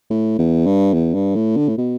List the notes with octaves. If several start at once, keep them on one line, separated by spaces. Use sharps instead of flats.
A2
E2
G2
E2
G2
A2
D3
A2
B2